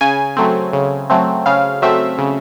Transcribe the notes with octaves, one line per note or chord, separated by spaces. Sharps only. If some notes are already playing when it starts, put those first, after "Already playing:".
C#3 G#5
F#3 A3 C4
C#3
F#3 A3 C4
C#3 F5
F#3 A3 C4 E5
C#3